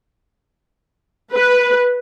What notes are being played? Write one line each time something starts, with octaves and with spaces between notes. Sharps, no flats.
B4